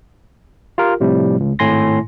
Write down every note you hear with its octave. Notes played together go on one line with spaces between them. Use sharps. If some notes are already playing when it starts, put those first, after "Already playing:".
F4 G4 A#4
A2 C3 F3 G3
C#2
G#1 A2 G#5 C6 A#6